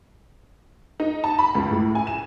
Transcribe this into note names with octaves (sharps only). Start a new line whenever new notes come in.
D#4
A5
B5
C#2
A2
G#5
E7